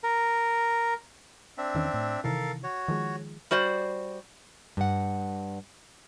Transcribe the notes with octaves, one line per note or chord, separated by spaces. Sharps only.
A#4
C4 D4 E5
E2 D#3 C#4
A2
C3 D#3 E3 A4 A#4 F5
F#4 C#5
D#3 F3 G#3
G3 F#4 C5 D5
G2 F#5